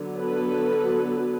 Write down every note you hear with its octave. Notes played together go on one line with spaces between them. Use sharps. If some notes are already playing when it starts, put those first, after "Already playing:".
Already playing: D3 F#3 B3
A4 B4